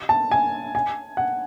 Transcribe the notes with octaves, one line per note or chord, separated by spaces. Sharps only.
A5
G#5
G#5
F#5